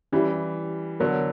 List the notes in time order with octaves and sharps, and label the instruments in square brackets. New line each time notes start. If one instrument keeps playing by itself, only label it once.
[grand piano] E3 G3 [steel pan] C#4 E4 G4
[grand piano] D3 F#3 [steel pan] B3 F#4 A#4 C#5